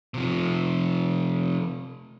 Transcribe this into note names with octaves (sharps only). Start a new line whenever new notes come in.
C3 F3